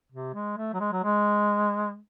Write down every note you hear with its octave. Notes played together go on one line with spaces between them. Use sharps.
C3
G#3
A3
F#3
G#3
F#3
G#3